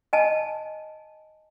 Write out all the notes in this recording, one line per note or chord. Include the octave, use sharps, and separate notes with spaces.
D#5 G#5 A5